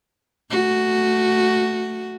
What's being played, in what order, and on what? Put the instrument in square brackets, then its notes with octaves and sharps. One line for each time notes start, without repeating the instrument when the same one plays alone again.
[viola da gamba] A3 F#4